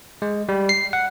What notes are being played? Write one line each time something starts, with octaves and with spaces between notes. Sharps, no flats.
G#3
G3
C7
F#5